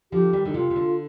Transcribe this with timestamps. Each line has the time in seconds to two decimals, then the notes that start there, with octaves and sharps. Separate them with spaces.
0.12 D3 F3 G4
0.33 D#3 G3
0.45 D3 D#4
0.54 C3 F4
0.70 C3
0.76 D3